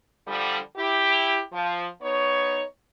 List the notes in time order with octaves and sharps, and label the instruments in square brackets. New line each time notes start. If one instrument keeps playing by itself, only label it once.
[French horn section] D3 F3 G3
E4 G4
F3
B3 D#4 C#5